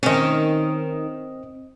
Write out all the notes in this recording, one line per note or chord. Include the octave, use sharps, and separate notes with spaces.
D#3 C4 C#4 D#5